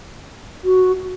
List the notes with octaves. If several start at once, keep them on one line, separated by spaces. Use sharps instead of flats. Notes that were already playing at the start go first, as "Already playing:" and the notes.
F#4